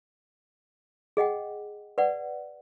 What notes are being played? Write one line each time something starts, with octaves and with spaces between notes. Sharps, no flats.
G#4 D#5 F#5 G5
B4 D5 F#5